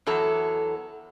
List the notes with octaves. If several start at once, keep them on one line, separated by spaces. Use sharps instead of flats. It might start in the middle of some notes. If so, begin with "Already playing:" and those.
E2 F#3 A4 A#5